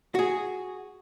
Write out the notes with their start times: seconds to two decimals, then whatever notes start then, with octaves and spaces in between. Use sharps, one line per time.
0.15 F#4 G#4